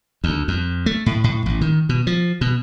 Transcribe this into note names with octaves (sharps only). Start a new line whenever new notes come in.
D2
F2
A3
A2
A2
A1
D#3
B2
F3
B2